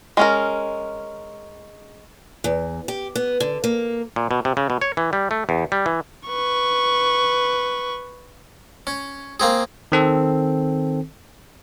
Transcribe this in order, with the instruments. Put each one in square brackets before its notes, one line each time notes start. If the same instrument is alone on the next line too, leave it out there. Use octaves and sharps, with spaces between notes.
[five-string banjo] G#3 C#4 A#4
[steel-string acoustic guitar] E2
G4
B3
D3
A#3
[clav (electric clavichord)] A#2
B2
C3
C#3
B2
C#5
E3
G3
A3
E2
G3
E3
[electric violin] B4 C#6
[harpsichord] C#4
A#3 C4 G#4
[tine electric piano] D#3 C4 A4